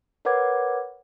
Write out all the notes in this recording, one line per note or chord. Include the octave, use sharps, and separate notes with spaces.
A#4 B4 C#5 F#5 D6 G#6